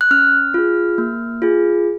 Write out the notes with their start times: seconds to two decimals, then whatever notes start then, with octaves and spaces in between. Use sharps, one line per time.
0.01 F#6
0.11 C#4 F6
0.54 F4 G#4
0.98 A#3
1.42 F4 G#4